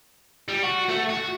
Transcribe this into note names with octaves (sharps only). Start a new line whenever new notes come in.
G3
F#4
A3
F#4